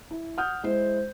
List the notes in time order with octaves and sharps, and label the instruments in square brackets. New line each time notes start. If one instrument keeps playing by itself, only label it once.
[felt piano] E4
F#5 D#6 F6 G6
G#3 E4 C5